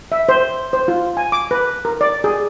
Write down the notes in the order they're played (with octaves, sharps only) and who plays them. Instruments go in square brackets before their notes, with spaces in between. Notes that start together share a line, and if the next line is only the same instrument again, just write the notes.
[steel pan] E5
C5
C5
F4
G#5
D6
B4
A#4
D5
G#4